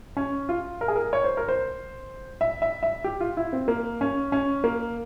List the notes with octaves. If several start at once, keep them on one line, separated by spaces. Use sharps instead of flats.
C#4
F4
A#4
G#4
A#4
C#5
C5
A#4
C5
E5
E5
E5
G4
F4
E4
C4
A#3
C#4
C#4
A#3